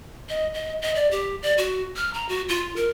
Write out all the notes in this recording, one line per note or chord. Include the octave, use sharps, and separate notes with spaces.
D#5
D#5
D#5
D5
G4
D5
F#4
F6
A#5
F#4
F4
A#4